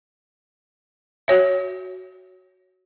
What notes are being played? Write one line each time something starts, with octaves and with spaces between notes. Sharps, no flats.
F#4 C#5 E5